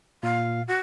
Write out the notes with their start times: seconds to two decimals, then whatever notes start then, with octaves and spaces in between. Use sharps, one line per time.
0.23 A#2 F5
0.68 F#4